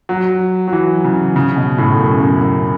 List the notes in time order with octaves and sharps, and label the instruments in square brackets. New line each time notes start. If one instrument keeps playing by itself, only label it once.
[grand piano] F#3
F#3
E3
C#3
C#3
B2
A2
F#2
F#2
F#2